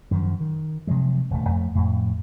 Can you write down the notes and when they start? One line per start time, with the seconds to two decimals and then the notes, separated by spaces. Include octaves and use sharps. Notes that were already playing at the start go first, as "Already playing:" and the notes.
0.11 F#2 D#3 F3
0.40 D#3
0.87 C3 F3 F#3 G#3
1.31 D#1 D2 A3
1.49 F2 A3
1.75 F2 A2